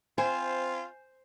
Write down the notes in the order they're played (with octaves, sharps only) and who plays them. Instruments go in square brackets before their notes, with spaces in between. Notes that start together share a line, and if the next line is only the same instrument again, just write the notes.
[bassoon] C4 [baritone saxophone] F4 [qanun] C5 [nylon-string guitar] G#5